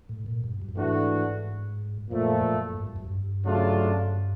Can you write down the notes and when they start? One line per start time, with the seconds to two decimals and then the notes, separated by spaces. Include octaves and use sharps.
0.09 A2
0.26 A#2
0.44 G2
0.62 F#2
0.69 G2
0.77 G#2 E3 A3 D4 F#4
2.10 F#2 A#2 F3 A3
2.44 F#2
2.77 G#2
2.87 G2
2.96 F#2
3.05 G2
3.44 C#3 F#3 A3 D4 F4